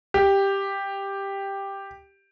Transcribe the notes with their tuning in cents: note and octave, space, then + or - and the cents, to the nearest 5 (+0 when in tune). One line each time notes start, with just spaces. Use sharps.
G4 +5